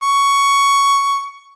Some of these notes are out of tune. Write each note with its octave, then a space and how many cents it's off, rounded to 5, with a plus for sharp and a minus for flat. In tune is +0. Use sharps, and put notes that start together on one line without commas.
C#6 +10